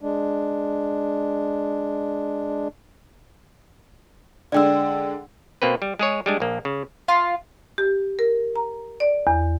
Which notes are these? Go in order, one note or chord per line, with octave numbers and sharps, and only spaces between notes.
G#3 D4
D3 G#3 D4 D5 G5 E6
B2 A#3 C4 B4
G3
G#3 G#4 C#5
G3 G#3 D4
A#1 A#3
C#3
F4
G4
A#4
A#5
D5
E2